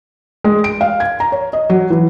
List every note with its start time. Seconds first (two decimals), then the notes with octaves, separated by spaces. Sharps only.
0.44 G#3
0.64 D7
0.81 F5
1.00 G#6
1.20 A#5
1.32 C#5
1.53 D#5
1.70 F#3
1.90 E3